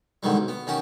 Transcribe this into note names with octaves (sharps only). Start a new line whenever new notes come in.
G#2 D3 D#3 F#3 G3
B1
B3
D#3 C#4 F#4 G4